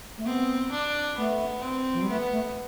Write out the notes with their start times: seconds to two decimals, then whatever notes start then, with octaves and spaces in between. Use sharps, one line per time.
0.18 A3
0.25 B3 C4
0.72 D4
1.17 A3 B3
1.63 C4
1.93 F3
2.02 G3
2.08 A3 B3
2.32 A3